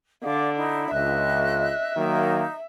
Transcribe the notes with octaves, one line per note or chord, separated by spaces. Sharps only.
D3 D5 F5 D6
D#4 E4
C#2 D#5 E5 F#6
D#3 F#3 A#3 D#4